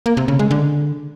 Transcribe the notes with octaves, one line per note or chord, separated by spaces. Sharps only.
A#3
C3
C#3
G#3
D3